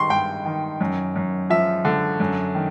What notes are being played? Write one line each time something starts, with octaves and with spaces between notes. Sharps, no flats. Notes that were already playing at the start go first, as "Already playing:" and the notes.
Already playing: G2 D#3 C6 C#6
G2 G5
D#3
F#2
F#2
F3 E5
D3
F#2
D#3